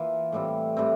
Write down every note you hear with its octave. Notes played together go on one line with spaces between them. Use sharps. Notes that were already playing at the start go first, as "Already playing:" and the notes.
Already playing: E3 A#3 F4
A2 E3 G3 C4
A2 E3 G3 C4